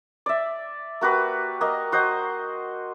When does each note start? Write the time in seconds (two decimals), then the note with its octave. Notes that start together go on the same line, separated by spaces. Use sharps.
0.26 D5 E5
1.01 A#3 F#4 G4 B4
1.61 A#3 D#5
1.92 F#4 C5 D#5